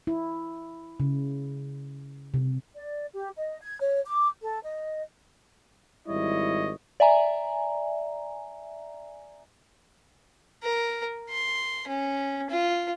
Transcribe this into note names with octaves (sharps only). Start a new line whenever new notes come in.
E4
C#3
C3
D5
G4
D#5
G#6
C#5
D6
A4
D#5
G#1 G3 E4 C#5 D#5
D5 E5 G#5 A#5
A#4
C6
C#4
F4